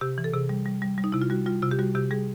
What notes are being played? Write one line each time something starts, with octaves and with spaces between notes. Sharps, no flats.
C3 G4
E3
A4
C3 G#4
G3
G3
G3
G3
D#4
C3 E4
F4
G3 F#4
G3 F4
C3 F4
G4
G3 F#4
C3 G4
G3 G#4